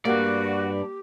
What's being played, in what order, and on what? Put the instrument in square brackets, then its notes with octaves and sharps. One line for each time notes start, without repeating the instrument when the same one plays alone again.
[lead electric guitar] G2 D5 [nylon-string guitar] A#3 [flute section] F#4 [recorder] G4